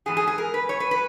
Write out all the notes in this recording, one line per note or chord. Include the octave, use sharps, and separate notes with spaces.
G#2 E3 B3 G#4
G#4
G#4
A#4
B4
C#5
B4
B4